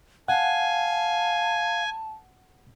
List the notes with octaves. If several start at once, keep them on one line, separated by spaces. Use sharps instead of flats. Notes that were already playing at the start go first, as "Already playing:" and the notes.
F5 F#5 G#5 A5